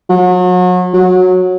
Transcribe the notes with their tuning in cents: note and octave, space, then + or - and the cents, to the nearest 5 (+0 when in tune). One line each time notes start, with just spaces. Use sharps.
F#3 -35
F#3 -15